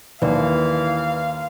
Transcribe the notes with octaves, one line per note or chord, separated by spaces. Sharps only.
D#2 E3 B4 D5 F5